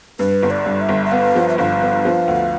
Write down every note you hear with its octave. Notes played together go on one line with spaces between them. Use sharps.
G2 B4
G1
D5
G2
E5
G1
E5
B3 F5
F3
E5
G1 F5
B3
F3
D2